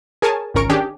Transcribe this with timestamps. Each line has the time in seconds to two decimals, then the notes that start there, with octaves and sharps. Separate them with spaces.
0.22 G#4 A#4 C#5 G#5 A5
0.54 G#1 C#2 C#4 A#4 C#6 D7
0.69 D#3 C#4 D4 G4 G#4